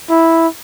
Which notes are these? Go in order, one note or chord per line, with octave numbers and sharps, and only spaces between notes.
E4